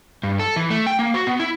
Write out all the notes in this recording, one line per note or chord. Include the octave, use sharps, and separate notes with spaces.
G2
A4
E3
A3
G5
A#3
F#4
B3
E4